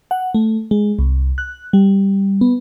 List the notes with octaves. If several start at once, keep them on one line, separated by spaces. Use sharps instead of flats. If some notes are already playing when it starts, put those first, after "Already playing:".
F#5
A3
G#3
C2
F#6
G3
B3